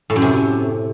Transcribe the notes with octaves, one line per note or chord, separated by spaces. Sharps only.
A2
F#2
C3